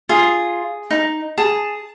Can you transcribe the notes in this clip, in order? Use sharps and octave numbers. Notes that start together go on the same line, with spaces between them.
F4 G#4
D#4
G#4 A5